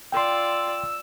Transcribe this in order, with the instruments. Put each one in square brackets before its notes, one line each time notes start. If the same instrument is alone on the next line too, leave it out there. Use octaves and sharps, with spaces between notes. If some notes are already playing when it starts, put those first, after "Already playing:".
[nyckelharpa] F4 D5 [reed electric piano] G5 C6 [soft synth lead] E6